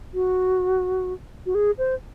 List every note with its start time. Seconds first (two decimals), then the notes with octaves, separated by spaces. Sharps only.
0.14 F#4
1.46 F#4
1.55 G#4
1.78 C5